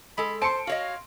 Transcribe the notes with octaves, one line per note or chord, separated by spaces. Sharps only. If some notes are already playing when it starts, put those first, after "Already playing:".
G#3 A4 B5
C5 A5 C6 C#7 D7
F#4 C#5 D#5 F5